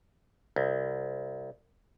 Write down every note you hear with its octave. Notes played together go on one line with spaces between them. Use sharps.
C2